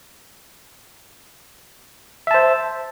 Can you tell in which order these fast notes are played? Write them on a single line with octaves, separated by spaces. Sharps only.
E5 A5 C5